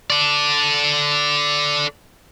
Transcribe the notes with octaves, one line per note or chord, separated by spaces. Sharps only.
A4 D5